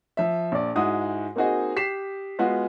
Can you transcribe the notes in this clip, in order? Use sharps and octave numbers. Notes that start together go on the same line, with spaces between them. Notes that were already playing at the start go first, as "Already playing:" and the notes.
F3 E5
A#1 D5
G#2 G#3 E4 F#4 D#6
A#3 C4 D#4 F#4 G#4 D#5
G4 B6 C7 E7
G#3 B3 F4 F#4